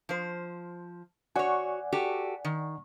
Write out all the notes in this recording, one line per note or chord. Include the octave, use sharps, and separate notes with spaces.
F3 C5
F#4 C#5 D5 F#5 G#5
F#4 G4 A4
D#3